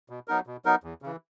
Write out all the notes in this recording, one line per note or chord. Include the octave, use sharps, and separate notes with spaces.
B2
F#3 B3 D#4 A#4
B2
F#3 B3 D#4 A#4
E2
C#3 E3